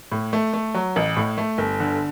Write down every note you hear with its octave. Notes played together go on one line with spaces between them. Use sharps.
A2
A3
A3
F#3
A1
A2
A3
G1
D3